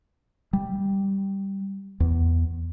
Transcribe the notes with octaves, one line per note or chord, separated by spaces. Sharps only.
G3
E2